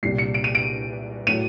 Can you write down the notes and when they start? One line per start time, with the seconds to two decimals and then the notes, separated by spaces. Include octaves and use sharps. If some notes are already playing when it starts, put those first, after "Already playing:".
0.03 C2 A#2 G3 C7
0.18 C#7
0.34 D7
0.44 D#7
0.55 D7
1.27 A2 F#3 D#7